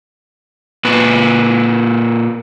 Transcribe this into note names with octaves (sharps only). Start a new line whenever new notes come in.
A#2 B4